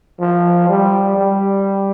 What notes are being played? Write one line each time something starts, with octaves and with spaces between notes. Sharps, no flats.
F3
G3
G3